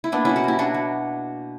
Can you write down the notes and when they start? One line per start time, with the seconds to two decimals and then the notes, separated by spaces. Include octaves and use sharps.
0.04 E4
0.12 A#3 B3 D4
0.25 B2 C#4 E4
0.36 F#4 A#4
0.44 A#3 E4 G4
0.59 F#3 D4 F#4
0.74 F#3